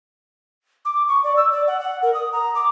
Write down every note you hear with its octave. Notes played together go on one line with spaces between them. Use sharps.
D6
C#6
D5
E6
D5
F#5
F#5
A#4
D#6
A#5
D6